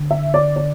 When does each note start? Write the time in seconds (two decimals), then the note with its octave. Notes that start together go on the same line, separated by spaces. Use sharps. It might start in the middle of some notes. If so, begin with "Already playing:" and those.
Already playing: D3
0.11 E5
0.34 D5
0.56 D5